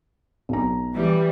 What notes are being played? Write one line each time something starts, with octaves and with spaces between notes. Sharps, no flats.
B1 A#5
E3 G3